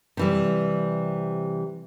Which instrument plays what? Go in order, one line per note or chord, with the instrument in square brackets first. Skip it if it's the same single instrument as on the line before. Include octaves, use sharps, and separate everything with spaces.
[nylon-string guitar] C3 E3 G3